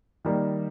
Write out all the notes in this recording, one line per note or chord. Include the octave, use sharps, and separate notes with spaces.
D#3 G3 A#3 D#4